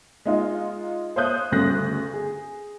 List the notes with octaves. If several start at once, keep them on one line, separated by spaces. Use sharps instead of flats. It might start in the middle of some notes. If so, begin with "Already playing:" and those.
G#3 D#4 F4
C5 C#5 F5 D#6 F#6 G6
G1 D2 C#3 F#6 A#6
G#4